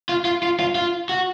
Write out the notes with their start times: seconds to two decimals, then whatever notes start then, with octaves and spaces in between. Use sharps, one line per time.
0.09 F4
0.25 F4
0.43 F4
0.60 F4
0.75 F4
1.09 F#4